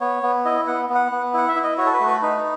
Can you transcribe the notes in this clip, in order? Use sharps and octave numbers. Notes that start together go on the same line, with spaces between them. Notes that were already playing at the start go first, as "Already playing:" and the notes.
B3 C#5
B3
E4 D#5
B3 F#5
B3
F#5
B3
E4 F#5
E5
E4
D#5
F#4 C#5
A4
B4
A3
B4
D#4 B4